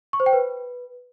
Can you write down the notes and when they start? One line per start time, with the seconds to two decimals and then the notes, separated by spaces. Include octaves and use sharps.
0.13 C#6
0.20 C5
0.26 G5
0.33 B4